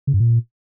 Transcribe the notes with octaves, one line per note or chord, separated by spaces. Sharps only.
C#3
G2
A#2